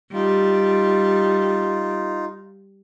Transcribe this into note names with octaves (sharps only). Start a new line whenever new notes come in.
G3 D#4 F4